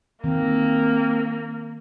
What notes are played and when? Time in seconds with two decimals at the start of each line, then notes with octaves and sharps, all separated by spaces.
0.24 D#3 A#3 C4